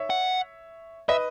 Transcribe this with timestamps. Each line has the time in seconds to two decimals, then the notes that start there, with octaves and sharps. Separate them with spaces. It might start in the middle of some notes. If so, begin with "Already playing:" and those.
Already playing: C#5 E5
0.10 F#5
1.08 B4 D#5 E5